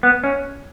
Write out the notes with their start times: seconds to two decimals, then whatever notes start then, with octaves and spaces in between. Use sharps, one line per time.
0.03 B3
0.24 C#4